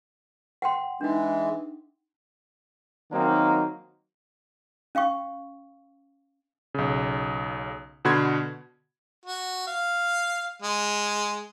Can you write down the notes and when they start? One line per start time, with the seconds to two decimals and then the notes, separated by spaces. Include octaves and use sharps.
0.62 F#5 G5 C6
1.01 E3 G#3 D4 D#4
3.12 D#3 F#3 A#3 C4 D#4
4.95 C#4 F5 G5 C#6
6.74 B1 C#3
8.05 B2 D3 F#4 B5 C6 G#6
9.25 F#4
9.67 F5
10.62 G#3